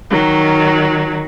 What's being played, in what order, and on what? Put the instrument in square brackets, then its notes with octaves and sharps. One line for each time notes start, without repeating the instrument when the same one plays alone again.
[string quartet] D#3 F#3